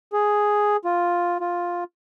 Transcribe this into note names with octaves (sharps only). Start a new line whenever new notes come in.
G#4
F4
F4